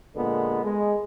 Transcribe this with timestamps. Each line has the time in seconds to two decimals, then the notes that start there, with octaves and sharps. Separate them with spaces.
0.16 A#2 D3 G#3 B3
0.64 G#3